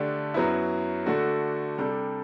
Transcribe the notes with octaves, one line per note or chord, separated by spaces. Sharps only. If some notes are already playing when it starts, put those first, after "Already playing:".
Already playing: D3 A3 D4 G4
F#2 F#3 B3 E4
D3 A3 D4 F#4 A4
C3 G3 D4 A4